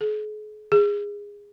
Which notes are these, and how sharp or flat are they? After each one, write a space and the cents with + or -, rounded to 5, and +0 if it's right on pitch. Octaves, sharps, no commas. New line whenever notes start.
G#4 +40
G#4 -20